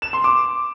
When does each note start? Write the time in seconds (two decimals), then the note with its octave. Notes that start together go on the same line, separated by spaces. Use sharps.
0.02 E7
0.13 C6
0.24 D6